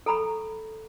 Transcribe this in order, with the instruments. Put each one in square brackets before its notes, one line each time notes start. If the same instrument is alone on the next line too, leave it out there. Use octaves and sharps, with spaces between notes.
[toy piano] A4 A#5 B5 C#6